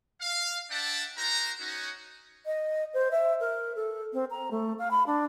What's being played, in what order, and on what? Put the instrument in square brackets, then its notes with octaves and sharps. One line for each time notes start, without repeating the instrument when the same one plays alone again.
[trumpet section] F5
D4 D5 E5 F#5 G5 A5
D#4 F#4 A#4 C5 A#5
C#4 D#4 F#4
[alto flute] D#5
C5
E5
A#4
A4
C4
A#5
A3
F5
B5
D4